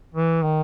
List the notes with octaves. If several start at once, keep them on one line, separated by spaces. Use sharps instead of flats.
E3
D#3